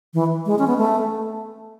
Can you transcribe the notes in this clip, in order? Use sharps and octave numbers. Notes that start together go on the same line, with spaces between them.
E3
G#3
C#4
B3
A3